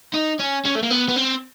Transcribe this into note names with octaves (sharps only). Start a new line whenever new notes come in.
D#4
C#4
C#4
A3
A#3
B3
B3
C4